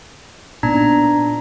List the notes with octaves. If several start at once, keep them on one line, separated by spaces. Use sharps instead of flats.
A#2 B3 D4 D#4 A#5